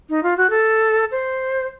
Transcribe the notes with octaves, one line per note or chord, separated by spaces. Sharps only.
D#4
F4
F#4
A4
C5